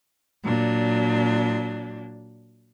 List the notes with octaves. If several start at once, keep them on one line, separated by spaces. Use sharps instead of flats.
A#2 F#3 D4